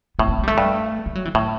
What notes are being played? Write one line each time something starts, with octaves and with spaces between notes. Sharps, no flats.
A2 B3
C4
B3
G3
A3
G2
G3
F#3
E3
A2 D3